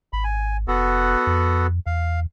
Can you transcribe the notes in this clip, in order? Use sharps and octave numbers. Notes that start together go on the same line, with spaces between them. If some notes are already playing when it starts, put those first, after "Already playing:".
G#1 B5
G#5
F1 B3 F#4 A4
F2
E2 F5